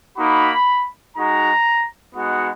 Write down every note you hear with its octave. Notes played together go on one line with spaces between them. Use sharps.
A#3 D#4 F#4 B5
G#3 D#4 F#4 A#5
G#3 B3 D#4 F#4 F#5